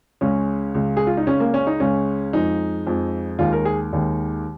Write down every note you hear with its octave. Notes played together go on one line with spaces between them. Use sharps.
C#2 C#3 G#3 C#4
C#2 C#3 G#3
G#4
F4
D#4
C#2 C#3 G#3 C#4
A#3
C#4
D#4
C#2 C#3 G#3 C#4
F2 F3 G#3 D#4
F2 F3 G#3
D#2 D#3 G#3 F4
A#4
G#4
D#2 D#3 G#3